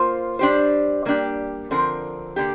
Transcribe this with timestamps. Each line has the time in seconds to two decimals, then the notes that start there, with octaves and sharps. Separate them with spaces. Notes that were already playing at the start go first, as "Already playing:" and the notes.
Already playing: A#3 F4 C5
0.39 G3 D4 G4 C5
1.05 G3 A#3 D4 G4
1.71 D3 F3 C4 A#4
2.36 D3 A#3 G4